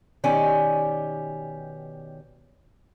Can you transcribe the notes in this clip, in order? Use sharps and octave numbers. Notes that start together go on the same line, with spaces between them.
B2 D#3 C#4 G4 D5 G#5